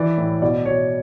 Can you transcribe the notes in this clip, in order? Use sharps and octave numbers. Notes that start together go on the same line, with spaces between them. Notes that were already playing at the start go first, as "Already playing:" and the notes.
Already playing: E3 D5
A2
B2 D5
B2 C#5